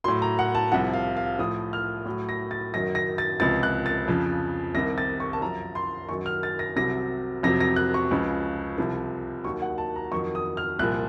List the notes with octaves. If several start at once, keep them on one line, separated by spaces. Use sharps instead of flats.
A2 F#3 C6
A#5
F#5
A5
C2 C3 F3 F#5
F5
F5
A2 F3 D#6
F6
A2 F#3
A#6
A6
F#2 D#3 F#3 A#6
A#6
A6
C#2 C3 F3 A6
F#6
A6
F2 C#3 F3
C2 C3 D#3 A#6
A6
C#6
A5
F#2 F3 A#5
C6
F#2 D#3 F#3 C#6
F6
A6
A#6
C2 C3 F#3 A#6
F2 C3 F#3 A#6
A#6
F#6
C#6
C#2 C#3 F3
C2 C3 F3
D#2 D#3 F#3 C#6
F#5
A5
A#5
F2 D#3 F#3 C#6
D#6
F6
C2 A#2 F3 F#6